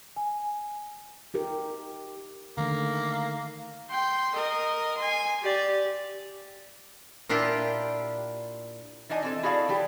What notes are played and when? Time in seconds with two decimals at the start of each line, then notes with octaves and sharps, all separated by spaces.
0.16 G#5
1.34 D#4 G4 A#4
2.57 D3 D#3 A3 A#3
3.90 G5 C6
4.36 A#4 D#5
4.98 G#5 C6
5.43 G4 D5
7.29 A#2 D4 E4 F4 G4
9.09 E3 D4 D#4 D#5 G#5
9.23 E3 C4 A4
9.43 E4 F#4 G#4 A4 D5 F5
9.69 E3 F#3 G4